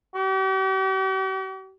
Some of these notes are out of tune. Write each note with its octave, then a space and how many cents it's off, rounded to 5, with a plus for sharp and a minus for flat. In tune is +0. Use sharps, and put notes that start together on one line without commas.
G4 -45